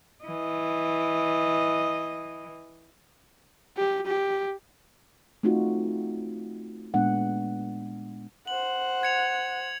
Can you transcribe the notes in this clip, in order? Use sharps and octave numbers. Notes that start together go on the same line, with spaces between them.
E3 D#5
G4
G4
A3 C4 D#4 F4 F#4
A#2 G#3 B3 D4 F#5
C5 F#5 F#7
G#6 C#7 F7